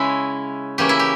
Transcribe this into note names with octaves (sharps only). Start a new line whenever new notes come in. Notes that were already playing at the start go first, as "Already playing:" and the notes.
Already playing: C#3 G#3 C#4 E4
C#3 E3 A#3 C#4 G4
E4
G4